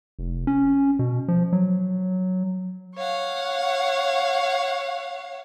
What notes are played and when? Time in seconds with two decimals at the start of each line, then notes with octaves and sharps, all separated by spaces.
0.19 F1
0.47 C#4
0.99 B2
1.28 F3
1.53 F#3
2.96 C#5 F5 F#5